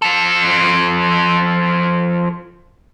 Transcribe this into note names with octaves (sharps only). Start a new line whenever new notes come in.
F3 A4